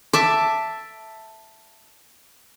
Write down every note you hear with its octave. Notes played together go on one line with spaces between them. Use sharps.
E5 A5 D6